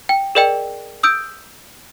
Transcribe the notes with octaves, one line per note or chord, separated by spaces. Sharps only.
G5
G#4 A#4 D5 D#5 G5
D#6 E6 G6 D7